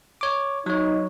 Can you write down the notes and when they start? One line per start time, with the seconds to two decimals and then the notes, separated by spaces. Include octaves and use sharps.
0.21 C#5 D6
0.66 F#3 D#4 C#5